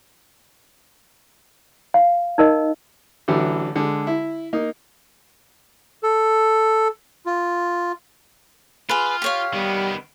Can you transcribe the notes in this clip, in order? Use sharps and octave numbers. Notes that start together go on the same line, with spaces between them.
F5
D#4 A#4 D#5
A1 D3 E3 F#3
D3 G#3
E4
A#3 D#4
A4
F4
F4 G#4 B4
G4 C#5 F5
D#3 G3 B3